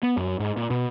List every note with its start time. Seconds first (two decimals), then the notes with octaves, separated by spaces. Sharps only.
0.03 B3
0.17 F#2
0.40 G#2
0.57 A#2
0.70 B2